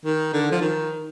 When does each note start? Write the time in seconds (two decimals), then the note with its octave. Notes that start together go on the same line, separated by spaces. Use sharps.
0.05 D#3
0.33 D3
0.52 F3
0.61 D#3